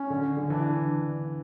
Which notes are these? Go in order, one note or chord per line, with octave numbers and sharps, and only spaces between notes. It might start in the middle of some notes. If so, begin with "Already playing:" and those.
Already playing: C#4
D3
D3
E3 D4